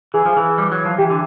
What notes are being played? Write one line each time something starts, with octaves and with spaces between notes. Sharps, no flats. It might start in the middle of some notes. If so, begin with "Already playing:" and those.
E3 G#4
F3
E3
G3
F#3
F3
E3 G4
D3